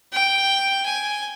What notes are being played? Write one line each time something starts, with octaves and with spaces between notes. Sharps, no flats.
G5
G#5